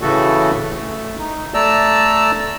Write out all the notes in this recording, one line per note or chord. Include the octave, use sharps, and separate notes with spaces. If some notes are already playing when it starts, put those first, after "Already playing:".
A2 C#3 E3 A3 F#4 A4
A3
D#4
A3 D5 A5 A#5 E6